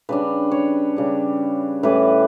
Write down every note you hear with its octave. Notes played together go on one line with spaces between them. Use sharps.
C#3 G3 D4 B4
C#5
C#3 G3 D4
A2 E3 G3 C#4 B4